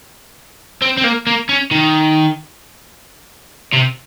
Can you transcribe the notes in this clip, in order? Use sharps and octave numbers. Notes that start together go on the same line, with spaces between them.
C4
C4
A#3
A#3
C#4
D#3
C3